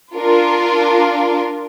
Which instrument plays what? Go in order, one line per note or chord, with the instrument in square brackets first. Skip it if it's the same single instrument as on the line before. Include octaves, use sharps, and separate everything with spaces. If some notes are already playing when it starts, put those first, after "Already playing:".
[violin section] D4 F4 A#4